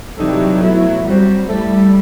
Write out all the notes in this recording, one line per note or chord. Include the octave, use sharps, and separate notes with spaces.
C3 E3 F#3 G3 D#4 A4
B2 A3 E4
F#3 G3 C4 F#4 C5
G3 A3 E4 A4